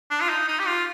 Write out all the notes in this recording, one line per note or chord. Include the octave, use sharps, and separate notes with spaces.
D4
F4
D#4
D#4
G4
F4